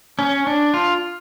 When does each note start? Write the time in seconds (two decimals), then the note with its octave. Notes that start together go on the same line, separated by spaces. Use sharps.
0.19 C#4
0.47 D4
0.74 F4